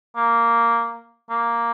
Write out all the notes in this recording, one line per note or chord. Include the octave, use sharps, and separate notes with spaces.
A#3
A#3